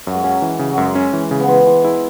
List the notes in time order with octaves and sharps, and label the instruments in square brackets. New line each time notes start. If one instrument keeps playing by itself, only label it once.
[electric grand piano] F#2 [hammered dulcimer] F#3
[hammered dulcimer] G#3
[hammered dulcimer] F#3 [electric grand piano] C#4
[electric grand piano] E3
C#3
[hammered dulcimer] F#3
[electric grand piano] F#2 [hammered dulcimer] G#3
[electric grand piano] C#4
E3
C#3
[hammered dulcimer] B3
[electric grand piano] E3 [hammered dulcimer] G#3
[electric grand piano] E3 [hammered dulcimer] G#3
[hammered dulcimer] G#3 [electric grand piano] E4